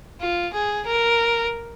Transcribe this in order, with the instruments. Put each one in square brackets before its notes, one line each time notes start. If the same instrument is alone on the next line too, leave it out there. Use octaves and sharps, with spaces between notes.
[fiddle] F4
G#4
A#4